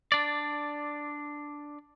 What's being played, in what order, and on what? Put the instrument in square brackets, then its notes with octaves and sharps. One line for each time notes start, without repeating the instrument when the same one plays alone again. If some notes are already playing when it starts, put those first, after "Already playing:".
[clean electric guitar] D4 D5